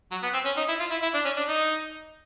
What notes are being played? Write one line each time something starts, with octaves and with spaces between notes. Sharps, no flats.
F#3
B3
C4
C#4
D#4
E4
F4
E4
E4
D4
C#4
D4
D#4